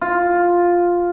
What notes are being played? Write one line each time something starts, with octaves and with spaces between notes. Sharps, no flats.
F4